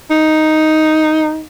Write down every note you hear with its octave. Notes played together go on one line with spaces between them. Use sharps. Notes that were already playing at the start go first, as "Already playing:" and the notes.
D#4